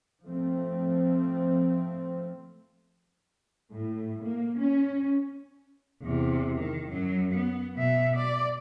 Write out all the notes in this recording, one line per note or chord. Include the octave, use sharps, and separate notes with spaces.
F3 A3 C4
A2
A#3
C#4
E2 C3
D#3
F#2 F#3
B3
B2 E5
D5